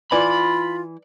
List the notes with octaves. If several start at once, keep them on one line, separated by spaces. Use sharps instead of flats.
E3 F4 D5 B5